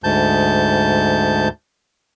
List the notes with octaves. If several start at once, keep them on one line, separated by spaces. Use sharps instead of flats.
D2 G#2 A5 G6